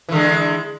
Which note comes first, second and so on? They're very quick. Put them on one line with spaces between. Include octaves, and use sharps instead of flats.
E3 D3 G#3